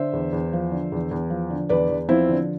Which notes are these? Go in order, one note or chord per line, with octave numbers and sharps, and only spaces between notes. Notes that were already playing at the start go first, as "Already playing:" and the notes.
Already playing: D3 C5 E5
E2
E2
F3
D3
E2
E2
F3
D3
E2 B4 D5
E2
F3 C4 E4
D3